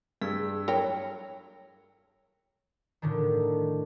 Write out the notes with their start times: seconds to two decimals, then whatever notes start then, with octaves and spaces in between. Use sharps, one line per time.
0.22 G2 G#4 E6
0.68 A2 F#3 A#4 C#5 G5
3.02 A2 D3 D#3